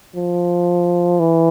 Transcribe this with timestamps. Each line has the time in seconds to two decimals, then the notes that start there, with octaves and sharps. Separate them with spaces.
0.16 F3
1.19 E3